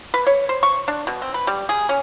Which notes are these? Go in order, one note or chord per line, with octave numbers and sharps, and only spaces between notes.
B4
C#5
C5
C#6
D4
B2
C4
B4
G3
G#4
C#4